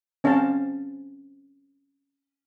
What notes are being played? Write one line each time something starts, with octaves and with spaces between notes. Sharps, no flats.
C4 C#4 C5 F5 A5